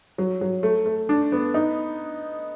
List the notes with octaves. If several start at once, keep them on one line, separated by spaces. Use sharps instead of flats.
F#3
F#3
A3
A3
D4
B3
D#4